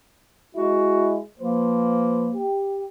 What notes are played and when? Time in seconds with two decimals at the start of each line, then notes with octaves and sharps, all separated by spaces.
0.55 G#3 E4 F#4
1.40 F3 A#3 B4 C5
2.34 G4